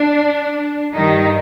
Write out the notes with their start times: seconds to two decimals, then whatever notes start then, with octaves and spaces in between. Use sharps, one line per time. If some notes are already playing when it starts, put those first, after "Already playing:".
Already playing: D4
0.95 G2 D#3 G3 D#4